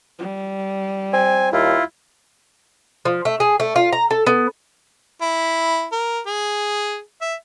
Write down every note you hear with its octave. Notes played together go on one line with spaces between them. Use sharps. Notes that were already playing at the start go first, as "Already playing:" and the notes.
G3
C4 G#5
D#2 E4 F4
F3
A3
G#4
A3
F4
A#5
A4
B3
E4
A#4
G#4
E5